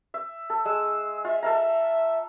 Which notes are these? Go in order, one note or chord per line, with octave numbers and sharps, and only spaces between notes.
E5
A4
G#3 E6
F4 E5
A4 E5 F5 A#5